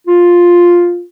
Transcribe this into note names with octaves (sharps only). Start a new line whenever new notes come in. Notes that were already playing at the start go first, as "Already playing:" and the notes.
F4